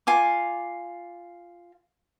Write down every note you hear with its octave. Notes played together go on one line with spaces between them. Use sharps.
F4 G#5 D6